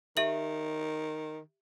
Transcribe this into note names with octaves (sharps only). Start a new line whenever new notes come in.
D#3 G4 E5 F#7